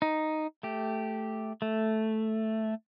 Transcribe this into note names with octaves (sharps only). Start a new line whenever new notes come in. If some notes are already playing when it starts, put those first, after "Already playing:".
D#4
A3 G4
A3